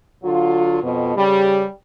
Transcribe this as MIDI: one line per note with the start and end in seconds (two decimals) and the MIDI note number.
0.24 0.79 50
0.24 0.79 54
0.24 0.79 65
0.82 1.11 41
0.82 1.11 47
1.15 1.64 49
1.15 1.64 55